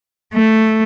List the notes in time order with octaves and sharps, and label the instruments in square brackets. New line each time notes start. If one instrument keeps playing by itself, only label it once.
[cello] A3